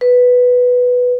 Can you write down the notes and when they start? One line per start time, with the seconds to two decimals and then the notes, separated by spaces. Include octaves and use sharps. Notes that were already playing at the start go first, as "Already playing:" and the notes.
0.01 B4